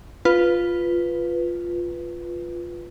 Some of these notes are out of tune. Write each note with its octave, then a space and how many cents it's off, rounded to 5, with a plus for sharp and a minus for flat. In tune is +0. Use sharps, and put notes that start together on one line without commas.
F4 +0 B4 +0